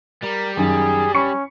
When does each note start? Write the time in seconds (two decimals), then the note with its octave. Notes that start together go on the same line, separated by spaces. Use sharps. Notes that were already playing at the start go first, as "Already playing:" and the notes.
0.23 G3 A#4
0.57 F#2 D#3 G#4
1.15 C#4 B5 C#6 C#7